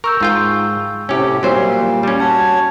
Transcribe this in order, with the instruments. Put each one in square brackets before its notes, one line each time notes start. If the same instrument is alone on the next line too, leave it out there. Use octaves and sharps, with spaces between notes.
[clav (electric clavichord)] A#4 [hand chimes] C#6 E6 G6
[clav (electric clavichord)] G#2 F4 G5
[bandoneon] A2 C3 [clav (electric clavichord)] C#4 G4
[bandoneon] A#2 G3 [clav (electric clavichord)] F#3 C4 C5 [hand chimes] A#3 C#5 C7
[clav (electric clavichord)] G3 C#4
[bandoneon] F#4 C#5 [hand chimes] A5